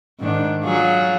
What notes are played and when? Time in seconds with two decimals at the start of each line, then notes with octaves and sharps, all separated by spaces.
0.20 G#2 D#3 D4
0.64 F#3 F4 G#4